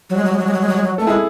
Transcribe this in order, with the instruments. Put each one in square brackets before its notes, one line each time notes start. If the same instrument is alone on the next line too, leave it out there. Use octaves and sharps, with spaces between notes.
[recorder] F#3
G#3
F#3
G#3
F#3
G#3
F#3
G#3
F#3
G#3
F#3
[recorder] A3 [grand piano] A4
[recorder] G#3 [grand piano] E4 G#4